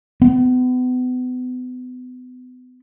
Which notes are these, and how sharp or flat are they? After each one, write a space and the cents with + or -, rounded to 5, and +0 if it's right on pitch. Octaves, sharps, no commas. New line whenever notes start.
B3 +35